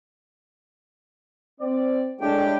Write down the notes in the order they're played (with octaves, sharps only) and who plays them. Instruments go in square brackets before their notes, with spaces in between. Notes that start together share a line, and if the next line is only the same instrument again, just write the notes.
[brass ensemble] C4 D5
[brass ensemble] A2 G#3 G4 [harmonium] D4 G5